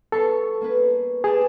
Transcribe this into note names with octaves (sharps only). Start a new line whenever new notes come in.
B3 A4 C#6 C7
A#3 C#4 B4
G4 G#4 B4 A5